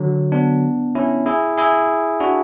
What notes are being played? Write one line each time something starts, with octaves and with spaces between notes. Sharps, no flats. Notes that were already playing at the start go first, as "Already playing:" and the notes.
Already playing: D3 F#3
B3 D4
C#4 E4
E4 G#4
E4 G#4
D4 F#4